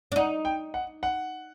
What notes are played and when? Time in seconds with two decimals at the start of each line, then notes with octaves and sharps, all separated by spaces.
0.12 D4
0.16 D#4 F#5
0.45 G5
0.74 F#5
1.03 F#5